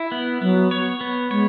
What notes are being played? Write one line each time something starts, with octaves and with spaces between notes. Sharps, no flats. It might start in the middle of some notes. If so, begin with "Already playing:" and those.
Already playing: E4
B3
F#3 B3
C#5
B3
G#3 C#5